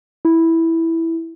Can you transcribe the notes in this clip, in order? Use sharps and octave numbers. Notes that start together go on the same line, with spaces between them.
E4